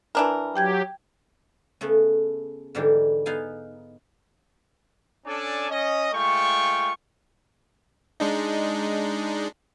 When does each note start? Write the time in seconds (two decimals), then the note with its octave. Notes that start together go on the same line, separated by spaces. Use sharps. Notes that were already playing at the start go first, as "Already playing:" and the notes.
0.15 E3 D4 A#4
0.56 F#3 G4 G5 G6 G#6
1.81 C#3 A3 B3
2.75 G#2 D3 E3 G3 D4 D#4
3.26 B3 D#4 F5 G#5
5.27 C#4 D4 A4 D5 G#5 A5
5.70 C#4 D#5
6.13 G#3 A3 F4 G5 C#6
8.20 G#3 D4 D#4